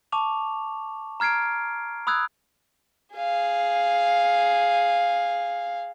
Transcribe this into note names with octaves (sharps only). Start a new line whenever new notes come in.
A5 C#6 D6 F7
A#5 F6 G#6 C7 D7
B5 D#6 E6 F#6 G#6
G#4 F5